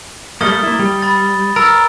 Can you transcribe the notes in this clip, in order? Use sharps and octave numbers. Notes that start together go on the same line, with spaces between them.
G3 A3 A#3 D#6 A6 G7
A#3 E4
G3
B5 A6
A#4 A#5 E6 A6